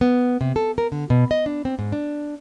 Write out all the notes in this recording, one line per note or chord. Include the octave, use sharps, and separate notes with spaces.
B3
C3
A4
A#4
D3
B2
D#5
D4
C4
G#2
D4